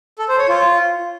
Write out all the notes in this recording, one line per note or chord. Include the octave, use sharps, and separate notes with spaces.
A4
C5
C#5
F4